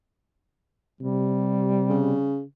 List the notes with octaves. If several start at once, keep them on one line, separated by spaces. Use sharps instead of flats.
C3 G3
C#3